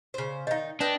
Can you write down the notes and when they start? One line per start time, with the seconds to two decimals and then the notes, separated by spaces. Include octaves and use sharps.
0.14 C#3 C5
0.47 D#3 D#4 D#5 F5
0.80 D4 B4 D#5 G5